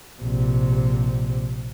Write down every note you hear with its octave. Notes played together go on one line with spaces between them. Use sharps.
A#1 C3